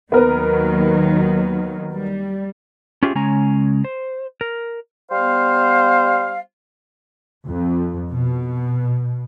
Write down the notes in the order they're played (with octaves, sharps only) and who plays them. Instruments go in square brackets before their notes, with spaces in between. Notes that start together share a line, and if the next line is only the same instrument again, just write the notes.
[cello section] D#2 D#3 F#3 [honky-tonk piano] B3 A#4 B4
[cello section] G3
[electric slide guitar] C#4 F4 G4 G#4 E5
C#3 G#3 C#4 G#5 A#5
C5
A#4
[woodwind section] G3 B3 C5 F5
[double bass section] F2
B2